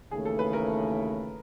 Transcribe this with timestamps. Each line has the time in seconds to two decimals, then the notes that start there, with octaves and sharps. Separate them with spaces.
0.11 D#2 C#3 E3 A3 G#4
0.25 A4
0.39 B4
0.53 A#4